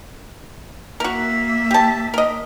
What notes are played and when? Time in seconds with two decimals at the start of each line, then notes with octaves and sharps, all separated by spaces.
1.00 A#3 F#4 A#4 E5
1.71 G4 A5
2.14 A#4 D#5